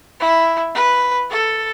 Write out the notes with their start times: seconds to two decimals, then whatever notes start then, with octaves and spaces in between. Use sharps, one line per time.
0.20 E4
0.75 B4
1.31 A4